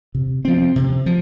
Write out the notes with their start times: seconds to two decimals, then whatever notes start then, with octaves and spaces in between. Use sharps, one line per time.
0.15 C3
0.45 F3 C4
0.76 C3
1.06 F3